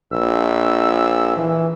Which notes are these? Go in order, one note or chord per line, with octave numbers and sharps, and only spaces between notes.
A#1 E6
E3